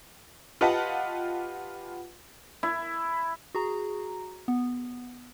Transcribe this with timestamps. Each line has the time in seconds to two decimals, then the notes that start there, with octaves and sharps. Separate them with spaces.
0.61 F4 G4 B4 D#5 F#5 A5
2.63 E4
3.55 F#4 G#4 A#5
4.48 B3